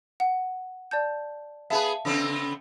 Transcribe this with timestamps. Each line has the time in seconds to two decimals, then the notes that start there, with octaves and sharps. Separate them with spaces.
0.20 F#5
0.91 D5 A5 G6
1.70 B3 G#4 B4 E5 F5 A5
2.05 C#3 B3 C4